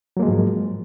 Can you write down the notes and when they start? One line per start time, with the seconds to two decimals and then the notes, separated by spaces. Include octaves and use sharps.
0.17 F#3
0.20 A#3
0.22 G#3
0.25 F3
0.28 G#2